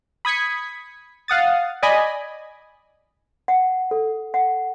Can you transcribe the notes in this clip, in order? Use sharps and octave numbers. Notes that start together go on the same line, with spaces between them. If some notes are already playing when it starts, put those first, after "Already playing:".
B5 D#6 G#6 B6 C#7
F5 F#5 D#6 A6
D5 D#5 G#5 B5
F#5
A4
F#5